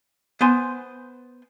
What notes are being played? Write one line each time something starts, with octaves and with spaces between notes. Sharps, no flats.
B3 C5 G#5 C6